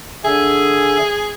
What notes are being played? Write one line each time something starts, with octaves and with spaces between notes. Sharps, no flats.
D3 G#4 E5 G#5